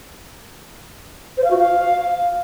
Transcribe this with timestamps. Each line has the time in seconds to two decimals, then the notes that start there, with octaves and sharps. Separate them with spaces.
1.37 C5
1.44 F5
1.51 F#4
1.57 F5